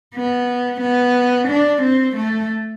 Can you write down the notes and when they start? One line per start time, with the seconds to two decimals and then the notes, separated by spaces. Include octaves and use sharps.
0.15 B3
0.81 B3
1.48 D4
1.82 C4
2.16 A3